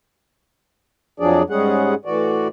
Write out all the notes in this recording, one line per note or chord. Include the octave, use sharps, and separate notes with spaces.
F2 F3 F#3 D4 G#4 D5
G#2 G3 G#3 C#4 G#4 F#5
A2 E3 F#4 D5